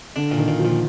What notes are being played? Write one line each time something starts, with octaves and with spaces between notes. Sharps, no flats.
D3 D4
A#2
D#3
A#2
F3
A#2